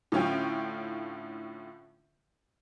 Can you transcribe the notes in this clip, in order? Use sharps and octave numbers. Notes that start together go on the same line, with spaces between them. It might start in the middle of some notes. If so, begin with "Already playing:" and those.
A2 D3 C#4 F4 G5